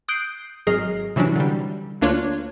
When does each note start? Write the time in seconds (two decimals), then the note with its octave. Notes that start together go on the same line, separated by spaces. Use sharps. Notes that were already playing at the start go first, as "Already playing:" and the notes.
0.09 D#6 F#6 G6 C7 D7
0.67 G#1 F#3 G#4 D#5 F6 C7
1.16 C3 E3 F#3 C#4 D4
1.36 D3 G3
2.01 D2 A#3 D4 F4 C#5 F#6